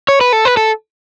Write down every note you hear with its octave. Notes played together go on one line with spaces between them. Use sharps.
C#5
B4
A4
B4
A4